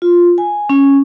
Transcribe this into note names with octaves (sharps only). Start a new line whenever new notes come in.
F4
G#5
C#4